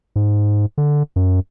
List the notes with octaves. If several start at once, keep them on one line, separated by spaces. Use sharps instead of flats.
G#2
D3
F#2